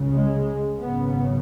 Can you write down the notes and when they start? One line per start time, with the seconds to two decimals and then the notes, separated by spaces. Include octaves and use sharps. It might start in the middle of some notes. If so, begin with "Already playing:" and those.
Already playing: C#2 C#3
0.11 G#3
0.79 G#1 F#2 C#3 B3